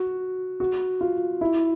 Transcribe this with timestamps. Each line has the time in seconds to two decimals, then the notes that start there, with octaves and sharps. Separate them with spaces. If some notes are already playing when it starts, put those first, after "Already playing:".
Already playing: F#4
0.60 F#4
1.01 F4
1.41 E4